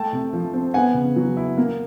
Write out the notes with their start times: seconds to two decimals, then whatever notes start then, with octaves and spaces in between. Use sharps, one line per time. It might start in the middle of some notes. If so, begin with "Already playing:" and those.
Already playing: A3 G5 A5
0.13 C3
0.33 F3
0.54 C4
0.74 B3 F#5 G#5
0.94 C#3
1.16 F#3
1.37 E4
1.58 A#3